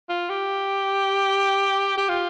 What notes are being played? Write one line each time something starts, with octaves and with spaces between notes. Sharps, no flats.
F4
G4
G4
F4